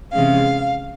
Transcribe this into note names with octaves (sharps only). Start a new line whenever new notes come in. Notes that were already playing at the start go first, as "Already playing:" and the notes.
C3 E3 G#3 C#4 F5